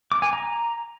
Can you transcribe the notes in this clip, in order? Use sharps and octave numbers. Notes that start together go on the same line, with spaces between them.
D6
G#5
A#5